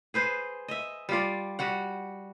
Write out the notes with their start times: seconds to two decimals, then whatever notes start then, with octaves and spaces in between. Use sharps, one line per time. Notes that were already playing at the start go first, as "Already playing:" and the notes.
0.14 G#4 B4 C5
0.68 D#5 E5
1.09 G3 F4 D5
1.59 G3 F#4 F#5